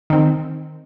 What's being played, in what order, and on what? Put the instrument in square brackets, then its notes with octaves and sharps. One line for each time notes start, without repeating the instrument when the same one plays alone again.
[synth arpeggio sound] D#3 C4